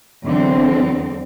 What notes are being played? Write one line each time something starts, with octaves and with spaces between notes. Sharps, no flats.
E2 D3 F#3 C4